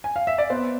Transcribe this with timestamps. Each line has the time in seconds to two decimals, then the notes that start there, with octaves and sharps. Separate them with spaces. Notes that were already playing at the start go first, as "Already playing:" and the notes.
0.04 G#5
0.16 F5
0.27 E5
0.38 D5
0.50 B3 C5